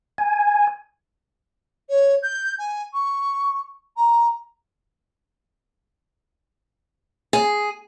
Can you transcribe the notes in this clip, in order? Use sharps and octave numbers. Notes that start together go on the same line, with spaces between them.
G#5
C#5
G6
G#5
C#6
A#5
G#4